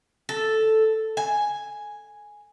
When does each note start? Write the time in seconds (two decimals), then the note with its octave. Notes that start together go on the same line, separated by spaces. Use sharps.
0.29 A4
1.17 G#5